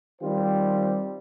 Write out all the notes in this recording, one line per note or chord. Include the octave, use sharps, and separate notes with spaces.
D#3 G3 C4 F4 G4 C5